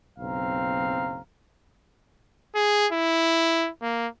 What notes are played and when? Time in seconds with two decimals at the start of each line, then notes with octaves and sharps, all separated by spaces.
0.19 F#1 B1 C4 F5 A#5
2.55 G#4
2.92 E4
3.82 A#3